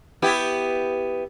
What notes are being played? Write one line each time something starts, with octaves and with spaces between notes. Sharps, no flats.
B3 E4 G4